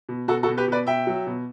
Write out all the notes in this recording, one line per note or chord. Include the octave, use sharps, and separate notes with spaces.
B2
B2 F#4 A4
F#4 A4
B2
G4 B4
B2 B4 D5
B2 E5 G5
F#3
B2